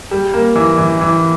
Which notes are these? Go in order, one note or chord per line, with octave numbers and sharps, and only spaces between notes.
G3
A#3
E3
E3
E3